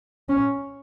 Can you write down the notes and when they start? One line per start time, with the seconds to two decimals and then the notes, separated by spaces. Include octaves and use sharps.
0.29 C#4